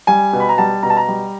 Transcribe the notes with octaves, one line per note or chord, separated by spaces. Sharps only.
G3 G#5
B2
B5
A#5
G3 A5
B2 A#5
A5
A#5
G3